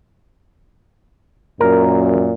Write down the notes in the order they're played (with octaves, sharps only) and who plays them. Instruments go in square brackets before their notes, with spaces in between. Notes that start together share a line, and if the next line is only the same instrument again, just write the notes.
[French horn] F#2 [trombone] A#2 [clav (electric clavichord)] A#4